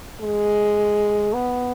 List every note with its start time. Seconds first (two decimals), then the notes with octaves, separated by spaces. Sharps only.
0.20 G#3
1.34 B3